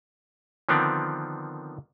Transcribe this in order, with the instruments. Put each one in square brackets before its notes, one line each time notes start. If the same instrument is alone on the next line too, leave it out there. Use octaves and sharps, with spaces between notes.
[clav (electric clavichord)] D3 D#3 F3 B3 C4 D4